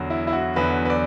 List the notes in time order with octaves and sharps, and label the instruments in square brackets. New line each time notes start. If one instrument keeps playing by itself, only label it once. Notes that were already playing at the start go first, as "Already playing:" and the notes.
Already playing: [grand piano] E2 D3 F#3
E4
E4
F#4
E2 D3 F#3 B4
B4
D5